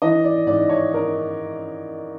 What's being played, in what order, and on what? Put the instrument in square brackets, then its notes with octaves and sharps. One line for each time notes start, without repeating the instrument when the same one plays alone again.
[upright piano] E3 D#5
D5
G#2 D5
C#5
A#4